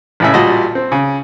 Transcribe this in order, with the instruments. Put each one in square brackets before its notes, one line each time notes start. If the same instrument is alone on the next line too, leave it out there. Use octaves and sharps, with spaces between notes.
[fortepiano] A1 A2 C#3 E5
A1 A#2 G3 F#4 D#5 A5
C4
C#3